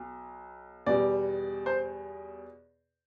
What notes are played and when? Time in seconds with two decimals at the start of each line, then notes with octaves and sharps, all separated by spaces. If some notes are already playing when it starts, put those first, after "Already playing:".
Already playing: B1
0.86 E2 B2 G3 D5
1.66 C5